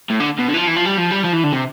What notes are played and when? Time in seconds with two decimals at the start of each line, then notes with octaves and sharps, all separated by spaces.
0.10 A2
0.20 D3
0.38 B2
0.48 D3
0.54 E3
0.57 F3
0.67 E3
0.76 F3
0.86 G3
0.98 F3
1.12 G3
1.25 F3
1.34 E3
1.44 D3
1.52 C3